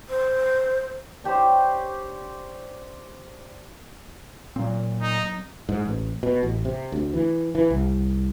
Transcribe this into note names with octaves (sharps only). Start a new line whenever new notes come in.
C5
D4 G4 C5 C#5
A#2 F#3 C4
D#4
G#2
A1
B2
A1
C3
D2
E3
E3
C2